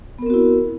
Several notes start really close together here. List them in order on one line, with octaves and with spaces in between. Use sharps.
B3 A#4 C4 F#4 E4